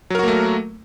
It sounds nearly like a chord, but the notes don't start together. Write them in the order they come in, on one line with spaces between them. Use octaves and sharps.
F#3 A#4 F#4 A#3 A3